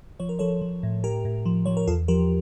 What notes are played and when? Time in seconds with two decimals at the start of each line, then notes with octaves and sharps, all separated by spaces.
0.20 F3 C#5
0.29 A#4
0.39 F3 A4 C#5
0.61 F3
0.83 A2
1.04 A2 G4 A#4
1.25 A2
1.46 F3
1.66 F3 C#5
1.77 A#4
1.88 E2 F4 A4
2.08 F3 G4 A#4